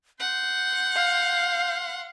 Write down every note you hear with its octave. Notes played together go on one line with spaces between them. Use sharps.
F#5 C6 G6
F5